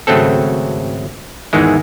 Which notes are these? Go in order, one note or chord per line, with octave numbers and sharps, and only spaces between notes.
G#1 C#3 F#3 A3 C4 A4
E2 G#2 D#3 E3 G#3